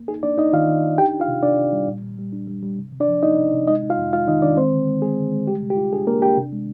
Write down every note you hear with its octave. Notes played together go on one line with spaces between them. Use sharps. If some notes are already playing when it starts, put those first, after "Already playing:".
Already playing: A#3
D#4 G#4
A#3 D4 D5
D#4 D#5
D#3 F4 F5
D#3
D#4
D4 G4 G5
D4
F4 F5
C3
C3 D4 D5
C3
G3
A#2
A#2
G3
D4
G3
G3
C3
C3
D4 D5
F3
A#3 D#4 D#5
C3
C3
G#3 D#4 D#5
D#4
F4 F5
F2
G#3 F4 F5
D#3 D#4 D#5
D#3 D4 D5
G#3 C4 C5
D3
G#3
G#3 G#4
D3
G#3
G3 G4
C3
G4
F4
D4 G#4
A#3 D4 A#4
D4 G4 G5
C3
G#3